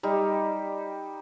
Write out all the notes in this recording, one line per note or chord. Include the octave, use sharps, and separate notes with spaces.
G3 D#4 G4